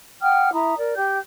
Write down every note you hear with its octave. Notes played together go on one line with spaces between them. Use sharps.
F#5 G5 D#6 F6
E4 E5 A#5 D#6
A#4 D5
G4 G5 G6